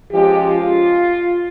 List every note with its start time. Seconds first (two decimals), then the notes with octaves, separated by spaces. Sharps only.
0.11 F3 G#3 C#4 G4
0.43 F4